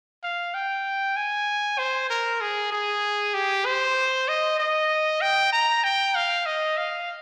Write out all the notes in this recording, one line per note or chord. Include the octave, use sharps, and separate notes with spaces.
F5
G5
G#5
C5
A#4
G#4
G#4
G4
C5
D#5
D#5
G5
A#5
G5
F5
D#5
F5